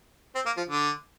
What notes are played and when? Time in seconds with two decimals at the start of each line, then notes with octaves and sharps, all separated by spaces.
0.35 C4
0.46 A#3
0.57 F3
0.69 D3